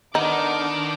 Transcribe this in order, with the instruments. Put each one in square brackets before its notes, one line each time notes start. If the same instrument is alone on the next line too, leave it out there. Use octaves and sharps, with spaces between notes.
[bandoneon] D3 B3 A#4 [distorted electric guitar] D#3 [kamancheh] D4 D6 [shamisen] D#4